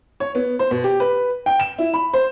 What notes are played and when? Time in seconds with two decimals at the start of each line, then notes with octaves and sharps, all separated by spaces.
0.20 C#5
0.35 B3
0.59 C5
0.71 B2
0.84 G4
1.00 B4
1.46 G5
1.60 E7
1.79 E4
1.94 B5
2.13 C5